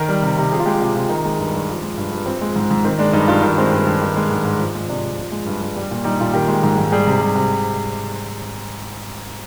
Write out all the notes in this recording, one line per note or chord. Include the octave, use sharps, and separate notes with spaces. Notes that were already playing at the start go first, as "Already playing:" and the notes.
Already playing: D#3 A#4
G3
C3
C3
F3 G#4
F4
G#3 G4
C3 G4
C3 F4
D#3 D#4
G#3
G2
G2
F3
G#3
G2
G2
F3 C4
G#3
G#2
G#2
D#3 C4
G#3 D4
G2 D#4
G2 F4
D#3 D4
G#3 C4
G2
G2
D#3
G#3
G#2
G#2
F3
G#3
C3 D4
C3
F3
G#3
G2
G2
G3
A#2
G3 D#4
A#2 F4
D#3 G4
G#3
G#2
G#2
G3 G#4
C3
G3
C3